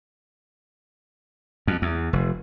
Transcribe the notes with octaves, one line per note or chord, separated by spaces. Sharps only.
F2
E2
F1